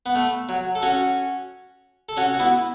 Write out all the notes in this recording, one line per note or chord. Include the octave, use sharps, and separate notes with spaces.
B3
A3
F#3
A4
C#4 F#4
A4
C#4 F#4
F#4
B3 E4